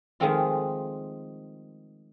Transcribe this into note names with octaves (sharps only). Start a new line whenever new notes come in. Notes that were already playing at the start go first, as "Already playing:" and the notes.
D#3 F3 G#3 A3 C4 F4